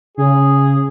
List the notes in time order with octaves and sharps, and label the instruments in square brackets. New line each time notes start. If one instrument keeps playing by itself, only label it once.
[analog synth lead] C#3 [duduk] G#4